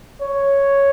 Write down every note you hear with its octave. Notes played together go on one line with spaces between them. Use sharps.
C#5